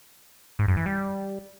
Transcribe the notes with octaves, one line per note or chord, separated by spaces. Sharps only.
G#2
F#2
E3
G3